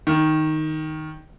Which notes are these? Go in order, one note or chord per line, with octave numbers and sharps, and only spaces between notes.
D#3